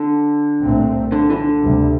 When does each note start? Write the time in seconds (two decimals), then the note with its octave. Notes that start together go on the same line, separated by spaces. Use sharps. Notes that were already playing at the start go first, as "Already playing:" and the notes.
Already playing: D3
0.63 C2 A#2 A3 C4
1.12 D3
1.30 E3
1.36 D3
1.61 D2 C3 G3